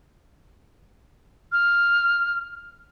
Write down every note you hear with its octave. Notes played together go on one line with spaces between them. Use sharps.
F6